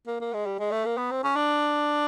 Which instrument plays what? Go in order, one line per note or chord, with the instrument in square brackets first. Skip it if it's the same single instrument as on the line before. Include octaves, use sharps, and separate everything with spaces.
[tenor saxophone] A#3
A#3
G#3
G3
G#3
A3
A#3
B3
C4
C#4
D4